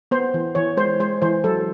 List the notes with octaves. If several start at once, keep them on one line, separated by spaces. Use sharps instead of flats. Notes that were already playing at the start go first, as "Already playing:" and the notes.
B3 C5
E3
E3 C#5
G#3 C5
G#3 C5
E3 C5
F#3 A4